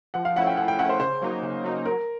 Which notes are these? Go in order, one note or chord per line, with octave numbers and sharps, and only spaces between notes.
F3 F#5
F5
A3 C#4 E4 F#5
G5
F3 F#5
G5
A3 C#4 E4 F#5
C5
C#3 C5
F#3 A#3 D#4
C#3
F#3 A#3 D#4
F#3 A#4